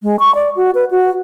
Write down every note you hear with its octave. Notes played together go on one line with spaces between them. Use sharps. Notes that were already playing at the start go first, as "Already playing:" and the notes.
G#3
C#6
D5
F#4
B4
F#4